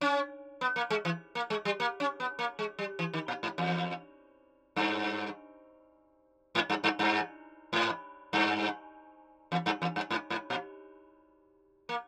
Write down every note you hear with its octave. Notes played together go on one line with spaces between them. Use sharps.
C#4
B3
A#3
G#3
E3
A#3
G#3
G3
A#3
C#4
B3
A#3
G#3
G3
E3
D#3
A#2
G#2
E2
G2
G#2
G2
G2
G2
G#2
G2
E2
G2
E2
G2
G#2
G#2
A#2
A#3